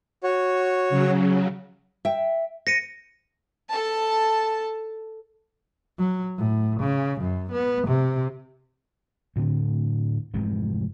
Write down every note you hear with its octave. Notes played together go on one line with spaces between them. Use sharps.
F#4 C#5
C#3 F#3
E5 G5
C5 A#6 C#7 D#7
A4 A5
F#3
A2
C#3
F#2
B3
C3
D2 A2 D3 C4
F1 G#2 C3 E3